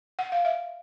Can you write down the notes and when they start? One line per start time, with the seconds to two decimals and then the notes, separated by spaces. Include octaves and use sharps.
0.19 F#5
0.32 F5
0.45 E5